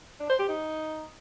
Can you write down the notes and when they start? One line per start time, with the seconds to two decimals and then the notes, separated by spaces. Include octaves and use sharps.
0.20 D4
0.30 C5
0.39 G4
0.49 D#4